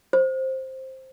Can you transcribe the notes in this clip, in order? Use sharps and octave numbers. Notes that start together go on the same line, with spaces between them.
C5